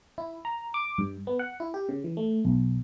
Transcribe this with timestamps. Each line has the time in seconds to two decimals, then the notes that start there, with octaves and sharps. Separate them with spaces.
0.18 E4
0.45 A#5
0.74 D6
0.98 G2
1.27 B3
1.39 F#5
1.60 E4
1.74 G4
1.89 C#3
2.04 E3
2.17 A3
2.45 B1